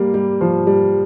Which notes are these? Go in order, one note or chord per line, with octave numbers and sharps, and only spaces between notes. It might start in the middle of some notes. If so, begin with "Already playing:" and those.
Already playing: G3 A#3
G3
F3
G3